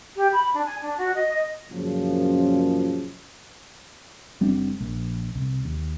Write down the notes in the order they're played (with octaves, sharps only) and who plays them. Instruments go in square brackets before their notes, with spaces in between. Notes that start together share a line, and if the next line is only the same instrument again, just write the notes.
[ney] G4
B5
D4
G#5
D4
F#4
D#5
D#5
[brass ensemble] F#2 A#2 C#3 F3
[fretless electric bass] F#1 G3 C4 D4
A#1
C2
D#2